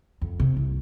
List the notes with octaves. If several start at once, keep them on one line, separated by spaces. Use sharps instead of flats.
F2
C3
C2